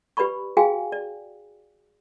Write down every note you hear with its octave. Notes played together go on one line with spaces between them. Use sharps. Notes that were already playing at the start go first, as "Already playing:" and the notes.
G4 B4 D5 B5 C#6
F#4 G#4 F5 G5 G#5
D5